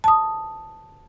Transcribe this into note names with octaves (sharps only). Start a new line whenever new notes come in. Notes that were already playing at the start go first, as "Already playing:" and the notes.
A5 D#6